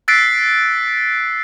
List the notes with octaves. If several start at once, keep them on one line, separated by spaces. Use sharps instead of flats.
E6 F#6 A6 B6 C7 D7